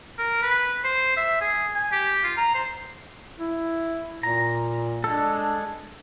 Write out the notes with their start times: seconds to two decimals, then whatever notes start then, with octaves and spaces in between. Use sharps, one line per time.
0.19 A#4
0.42 B4
0.84 C5
1.17 E5
1.41 G#4
1.75 G#5
1.92 G4
2.24 F4
2.37 A#5
2.54 C5
3.40 E4
4.23 A#2 A#5
5.04 G#3 D4 A4